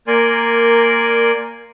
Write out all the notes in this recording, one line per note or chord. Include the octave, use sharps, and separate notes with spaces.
A#3 A#4 D5 G#5 C6